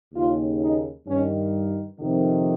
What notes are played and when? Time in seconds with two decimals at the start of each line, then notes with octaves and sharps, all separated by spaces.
0.13 D#2 C#3 F4
0.60 D#4
1.06 G2 D#3 C#4
1.99 F2 C3 D#3